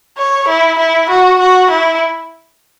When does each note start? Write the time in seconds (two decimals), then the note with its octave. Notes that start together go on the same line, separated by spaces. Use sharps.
0.18 C#5
0.48 E4
0.79 E4
1.10 F#4
1.39 F#4
1.70 E4